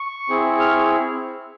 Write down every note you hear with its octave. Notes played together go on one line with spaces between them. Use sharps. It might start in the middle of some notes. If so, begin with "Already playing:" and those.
Already playing: C#6
C4 E4 G#4
F6